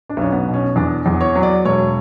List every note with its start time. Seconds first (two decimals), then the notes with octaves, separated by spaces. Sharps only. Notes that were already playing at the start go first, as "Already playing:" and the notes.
0.09 D4
0.17 B1 C#4
0.32 B3
0.47 B2
0.54 C#4
0.76 E2 D4
1.06 E2
1.21 C#5
1.35 F#3
1.43 D5
1.65 E1 C#5